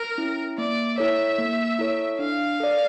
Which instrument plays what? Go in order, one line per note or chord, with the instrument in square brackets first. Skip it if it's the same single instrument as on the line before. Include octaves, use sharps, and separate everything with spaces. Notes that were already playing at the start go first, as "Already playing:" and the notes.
Already playing: [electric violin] A#4
[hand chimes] C#4 E4
[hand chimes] A#3 [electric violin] D5
[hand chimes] E4 A4 C#5 [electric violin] E5
[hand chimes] A#3
E4 A4 C#5
[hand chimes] D4 [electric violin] F5
[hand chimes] A4 D5